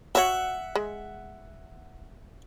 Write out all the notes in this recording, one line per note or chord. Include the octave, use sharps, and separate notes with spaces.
F#4 C#5 E5 F#5
G#3